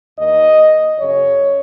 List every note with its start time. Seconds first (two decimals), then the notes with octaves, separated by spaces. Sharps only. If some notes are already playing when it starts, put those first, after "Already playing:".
0.17 D#2 D#3 D#5
0.97 F#2 C#3 C#5